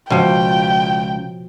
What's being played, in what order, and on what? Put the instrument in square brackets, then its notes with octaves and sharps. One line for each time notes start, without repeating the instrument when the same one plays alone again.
[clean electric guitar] C#2 [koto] B2 F3 [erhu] G5